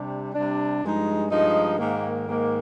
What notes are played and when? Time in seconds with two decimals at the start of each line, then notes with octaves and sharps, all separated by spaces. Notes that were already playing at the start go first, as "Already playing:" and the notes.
Already playing: C3 G3 D4
0.33 C3 G3 D4
0.81 G2 F3 G#3 D#4
1.29 G2 F3 G#3 D#4
1.78 G#2 D#3 A#3
2.26 G#2 D#3 A#3